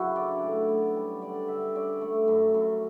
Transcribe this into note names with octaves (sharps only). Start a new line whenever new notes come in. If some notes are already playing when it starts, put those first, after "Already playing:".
Already playing: F#2 C#3 F#3 E4 F#4 B4
D4 D5
A2
B3
G3
D3 D5
D3 E5
C#4 D5
A3
F#2
F#2